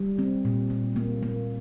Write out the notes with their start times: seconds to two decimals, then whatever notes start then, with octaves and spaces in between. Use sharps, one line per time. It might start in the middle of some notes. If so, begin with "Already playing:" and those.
Already playing: G3
0.19 C4
0.45 A#2
0.70 A#2
0.96 A#3
1.23 A#3